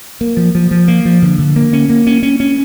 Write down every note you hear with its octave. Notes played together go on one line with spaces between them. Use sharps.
A#3
F3
F3
F3
A#3
F3
D3
D3
A#3
C#4
A#3
C#4
C#4
C#4